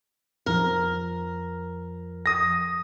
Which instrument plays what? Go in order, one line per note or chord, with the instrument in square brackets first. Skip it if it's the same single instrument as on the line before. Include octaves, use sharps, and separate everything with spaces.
[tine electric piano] F2 F3 [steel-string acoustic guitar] A#4
[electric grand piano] D#6 A#6